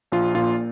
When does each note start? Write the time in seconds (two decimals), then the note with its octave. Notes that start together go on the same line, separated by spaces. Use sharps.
0.12 A#1 F4
0.35 A#2 F4